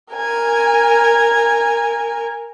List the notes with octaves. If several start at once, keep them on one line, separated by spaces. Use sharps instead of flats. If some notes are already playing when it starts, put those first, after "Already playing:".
A#4 G#5